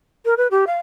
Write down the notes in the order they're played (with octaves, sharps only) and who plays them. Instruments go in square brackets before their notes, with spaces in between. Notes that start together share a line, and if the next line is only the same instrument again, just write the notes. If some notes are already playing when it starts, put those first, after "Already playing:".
[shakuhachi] A#4
B4
G4
F5